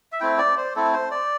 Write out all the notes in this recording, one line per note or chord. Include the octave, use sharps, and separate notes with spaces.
E5
A3 C4 E4 G5
D5
C5
A3 C4 E4 A4
C5
D5